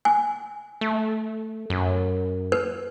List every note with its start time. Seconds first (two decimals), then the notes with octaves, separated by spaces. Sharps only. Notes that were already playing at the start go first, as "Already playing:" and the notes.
0.05 G#5
0.81 A3
1.70 F#2
2.52 B4